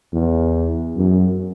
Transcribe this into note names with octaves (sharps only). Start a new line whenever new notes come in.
E2
F#2